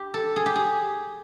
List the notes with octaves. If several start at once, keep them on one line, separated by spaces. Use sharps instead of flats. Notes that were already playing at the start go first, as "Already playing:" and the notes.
Already playing: G4
A4
G#4
G4
G#4